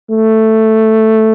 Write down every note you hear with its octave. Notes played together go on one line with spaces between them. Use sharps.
A3